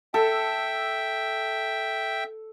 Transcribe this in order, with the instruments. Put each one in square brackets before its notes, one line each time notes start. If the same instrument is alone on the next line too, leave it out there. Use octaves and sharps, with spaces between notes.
[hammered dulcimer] A4 [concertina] E5 G5